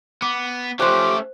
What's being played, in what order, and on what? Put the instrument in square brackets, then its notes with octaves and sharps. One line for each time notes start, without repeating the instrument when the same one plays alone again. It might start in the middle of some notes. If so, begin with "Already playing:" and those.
[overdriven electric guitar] B3 [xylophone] D6
[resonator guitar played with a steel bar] F3 G4 [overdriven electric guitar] A3 C#4 [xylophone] C5 F#6 [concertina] D6